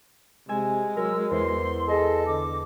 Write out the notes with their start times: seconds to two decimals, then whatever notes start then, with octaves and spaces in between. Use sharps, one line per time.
0.49 C3 G#3 G#5 E6
0.97 F#3 A#4 E6
1.31 E2 C5 C6
1.88 G#4 A4 D#5
2.26 D3 D6